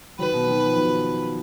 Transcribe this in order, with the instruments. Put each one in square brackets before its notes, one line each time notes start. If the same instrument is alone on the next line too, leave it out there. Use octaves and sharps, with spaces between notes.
[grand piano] D#3 F#3 [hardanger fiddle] B4
[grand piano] B2 D#3
D#3 F#3
F3
B2 D#3